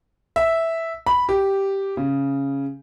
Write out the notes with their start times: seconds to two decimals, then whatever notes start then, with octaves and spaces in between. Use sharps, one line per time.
0.36 E5
1.06 B5
1.29 G4
1.97 C#3